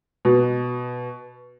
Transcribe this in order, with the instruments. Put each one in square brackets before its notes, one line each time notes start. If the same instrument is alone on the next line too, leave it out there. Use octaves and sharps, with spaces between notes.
[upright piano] B2